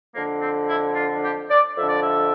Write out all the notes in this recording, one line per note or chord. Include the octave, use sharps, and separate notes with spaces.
F2 D3 A#3
C4
E4
F4
G4
D5
F2 D3 E5
D5
E5